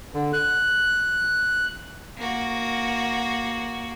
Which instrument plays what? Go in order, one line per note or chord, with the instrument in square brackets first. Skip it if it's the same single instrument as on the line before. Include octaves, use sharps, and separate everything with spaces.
[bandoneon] D3
F#6
[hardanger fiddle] A#3 F#4